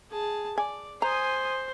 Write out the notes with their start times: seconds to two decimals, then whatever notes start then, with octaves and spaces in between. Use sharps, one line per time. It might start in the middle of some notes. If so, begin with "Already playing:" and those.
0.11 G#4 A5
0.58 D5 G#5
1.02 C5 G#5 A#5 D#6